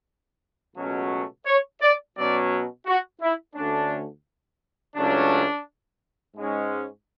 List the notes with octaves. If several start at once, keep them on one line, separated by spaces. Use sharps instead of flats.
C#2 B2 F#3 A3 C#4
C#5
D5
B2 F#3 C#4 D5
F#4
E4
D2 D3 A3 C#4 D4
C#2 C#3 F#3 A3 C#4 D4
G#2 G#3 C#4